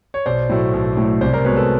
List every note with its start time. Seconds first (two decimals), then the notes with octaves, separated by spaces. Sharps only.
0.14 C#5
0.26 B1 C5 D5
0.49 A2 F#3 A3
0.74 B1
0.97 A2 F#3 A3
1.21 C2 C5 D5
1.33 A#4 C5
1.45 B2 G#3 B4 C#5
1.56 A4 B4